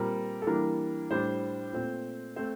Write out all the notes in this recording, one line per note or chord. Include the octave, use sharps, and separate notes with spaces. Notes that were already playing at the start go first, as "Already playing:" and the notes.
Already playing: A#2 G3 C4 A#4
A4
E3 G3 A#3 D4 A#4
A2 G3 D4 C5
A#2 A3 C4
A3 C4 C5